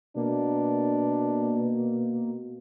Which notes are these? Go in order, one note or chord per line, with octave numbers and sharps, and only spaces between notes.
B2 A#3 D4